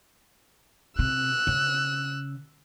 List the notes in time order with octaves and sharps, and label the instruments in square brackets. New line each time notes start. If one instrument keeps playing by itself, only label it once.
[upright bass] C3 [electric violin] E6 F#6
[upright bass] C#3